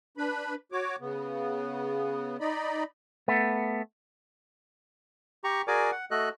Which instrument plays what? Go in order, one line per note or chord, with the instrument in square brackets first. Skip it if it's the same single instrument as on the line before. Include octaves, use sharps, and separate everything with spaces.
[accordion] D4 B4 B5
F#4 C#5 D6
C#3 B3
D#4 D5 D#5 B5
[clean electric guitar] A3 B3
[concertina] G4 A#5 C#6
F#4 G#4 A#4 D5 G#5 D6
F#5
A3 F#4 A4 D#5 F#6